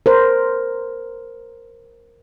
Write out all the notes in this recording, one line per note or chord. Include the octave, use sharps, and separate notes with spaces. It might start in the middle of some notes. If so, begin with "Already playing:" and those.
A#4 C5